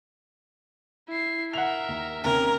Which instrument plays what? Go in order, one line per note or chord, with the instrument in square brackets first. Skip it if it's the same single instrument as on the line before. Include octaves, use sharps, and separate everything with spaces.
[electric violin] E4 C7
[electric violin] A#4 E5 [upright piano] F#5 F7
[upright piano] D#2
[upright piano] D#2 C3 [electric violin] C#4 [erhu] A#4